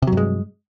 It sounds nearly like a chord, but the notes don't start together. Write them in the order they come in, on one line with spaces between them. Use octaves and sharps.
C3 F#3 G2 G#3